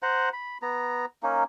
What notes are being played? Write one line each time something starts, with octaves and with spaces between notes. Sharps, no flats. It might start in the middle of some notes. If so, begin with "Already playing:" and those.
C5 F#5 A#5
B5
B3 A#5
A#3 C#4 D#4